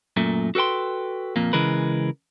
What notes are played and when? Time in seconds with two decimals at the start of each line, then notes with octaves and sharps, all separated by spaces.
0.17 F#2 A#2 A3
0.55 F#4 A4 B4 G5 C6
1.36 F2 A#2 A#3
1.53 C#3 E3 G#3 A#4 B4